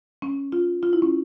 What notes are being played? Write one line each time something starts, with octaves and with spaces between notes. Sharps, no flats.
C#4
F4
F4
E4
C#4